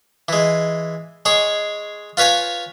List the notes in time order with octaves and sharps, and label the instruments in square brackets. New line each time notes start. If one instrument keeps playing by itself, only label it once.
[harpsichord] E3 G#3
G#3 G#4 C#5
F4 B4 C#5 F5 G#5